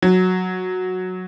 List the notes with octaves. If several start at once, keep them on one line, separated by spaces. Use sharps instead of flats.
F#3